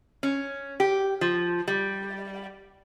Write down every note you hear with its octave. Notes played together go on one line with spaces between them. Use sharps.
C#4
G4
F3
G3